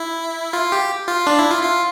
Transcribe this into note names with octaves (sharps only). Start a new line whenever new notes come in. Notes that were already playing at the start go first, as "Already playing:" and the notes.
Already playing: E4
F4
G4
F4
D4
E4
F4
F4